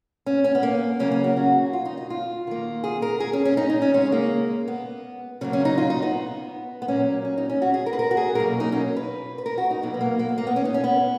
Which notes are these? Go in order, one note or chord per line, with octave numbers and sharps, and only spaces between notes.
C#4
C#4
B3
A#3
C#3 F#3 A#3 C#4
C#4
F#4
F#4
F4
D#4
D#4
F4
D#3 A#3
G#4
A#4
G#4
C#4
C#4
D#4
D#4
C#4
C#3 G#3 C#4
A#3
B3
C#3 F#3 A#3 C#4
C#4
D#4
F4
D#4
B3
B3
A#2 F#3 A#3 C#4
C#4
D#4
C#4
F#4
G#4
A#4
B4
A#4
F#4
G#4
B2 F#3 A#3 A#4
D#4
C#4
B4
B4
A#4
F#4
D#4
B2 F#3 A#3 B3
B3
A#3
A#3
B3
A#3
B3
C#4
D#4
C#4
B3